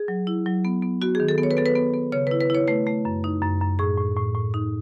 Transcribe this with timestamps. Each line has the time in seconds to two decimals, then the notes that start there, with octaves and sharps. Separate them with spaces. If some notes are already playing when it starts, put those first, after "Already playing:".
Already playing: G#4
0.08 F#3
0.27 E4
0.46 F#3
0.65 B3
0.83 B3
1.02 B3 F#4
1.15 D#3 G#4
1.28 A4
1.38 B3
1.43 C#5
1.51 B4
1.57 B3 A4
1.66 B4
1.76 B3
1.94 B3
2.12 C#3 C#5
2.27 E4 B4
2.41 B4
2.50 E4 C#5
2.68 A3 B4
2.86 A3
3.05 F#2
3.24 D#4
3.43 F#2
3.61 F#2
3.79 A2 G#4
3.98 A2
4.16 A2
4.35 A2
4.54 D#4